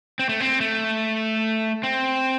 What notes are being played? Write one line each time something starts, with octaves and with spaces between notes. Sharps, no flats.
C4
A3
C4
A3
C4